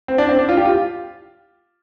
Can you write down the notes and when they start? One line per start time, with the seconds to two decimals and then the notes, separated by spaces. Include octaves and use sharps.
0.08 C4
0.18 D4
0.29 C4
0.39 D4
0.49 F4
0.57 G4
0.65 F4